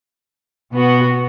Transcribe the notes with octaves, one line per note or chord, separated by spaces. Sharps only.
B2 B3 F#4